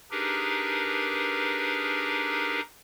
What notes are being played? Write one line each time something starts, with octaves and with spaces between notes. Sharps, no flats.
D4 D#4 G4 G#4 A#4 B4